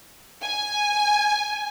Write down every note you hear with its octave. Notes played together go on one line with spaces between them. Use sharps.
G#5